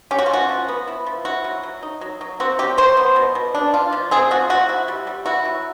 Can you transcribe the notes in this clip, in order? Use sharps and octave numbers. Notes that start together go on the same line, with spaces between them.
C#4 G4
F#4
F4
F3 F#4
F3
B3
E4
F3
E4 F#4
F#3
F#3
D#4
F#3
F#3
C4 F#4
F#3 G4
F#3 C5
B3
B2
B2
D4
F4
F3
C4 G#4
F3 F#4
F3 F#4
E4
G3
G3
E4 F#4
F#3